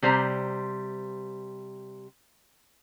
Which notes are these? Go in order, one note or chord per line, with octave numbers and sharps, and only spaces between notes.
C3 G3 C5 A#5